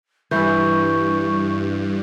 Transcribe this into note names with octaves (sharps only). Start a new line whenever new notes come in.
G2 E3 E4 C#6 G6